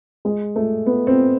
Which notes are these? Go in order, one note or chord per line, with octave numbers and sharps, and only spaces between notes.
G#3
A3
B3
C4